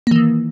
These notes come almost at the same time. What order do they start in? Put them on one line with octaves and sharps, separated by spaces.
A#3 E3 D#3